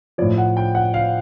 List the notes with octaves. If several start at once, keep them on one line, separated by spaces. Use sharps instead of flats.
A2 F3 D5
F#5
G5
F#5
F5